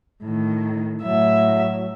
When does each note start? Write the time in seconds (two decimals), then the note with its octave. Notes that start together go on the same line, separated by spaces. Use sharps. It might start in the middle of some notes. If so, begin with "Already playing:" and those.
0.23 A2 D#3
1.03 A2 F#3 E5